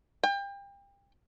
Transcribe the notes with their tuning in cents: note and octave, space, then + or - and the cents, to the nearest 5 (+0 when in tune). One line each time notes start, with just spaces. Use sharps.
G5 +30